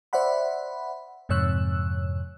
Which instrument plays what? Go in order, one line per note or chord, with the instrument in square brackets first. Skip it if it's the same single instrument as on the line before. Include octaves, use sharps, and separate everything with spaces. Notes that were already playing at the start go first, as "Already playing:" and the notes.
[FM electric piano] C5 D5 E5 F#5 B5
F2 G#2 C3 C#5 E6 F#6